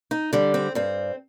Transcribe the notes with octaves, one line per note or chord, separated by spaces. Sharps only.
D#4
D3 G3 D4
C4
G2 C4